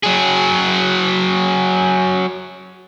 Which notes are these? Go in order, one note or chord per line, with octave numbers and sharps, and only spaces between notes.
F#3 G#4